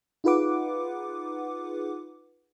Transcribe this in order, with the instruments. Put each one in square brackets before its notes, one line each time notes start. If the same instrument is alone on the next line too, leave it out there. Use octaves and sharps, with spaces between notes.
[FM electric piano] D#4 F4 G#4 B4 F#5 D6